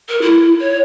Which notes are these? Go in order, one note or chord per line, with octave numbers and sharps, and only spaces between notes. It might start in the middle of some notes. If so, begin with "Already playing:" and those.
A#4
E4
C#5